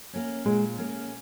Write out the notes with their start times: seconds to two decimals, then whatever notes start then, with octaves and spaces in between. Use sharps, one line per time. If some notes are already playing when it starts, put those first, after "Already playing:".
0.13 A#3 C#4
0.45 A#2 G#3
0.78 A#3 C#4